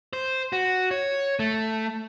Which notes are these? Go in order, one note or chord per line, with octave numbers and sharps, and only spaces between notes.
C5
F#4
C#5
A3